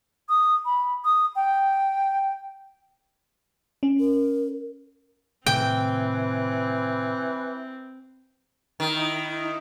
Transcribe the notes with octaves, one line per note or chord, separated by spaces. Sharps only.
D#6
B5
D#6
G5
C#4
A#4
A2 C3 D#3 E3 C4 G5
D#3 D#4 E4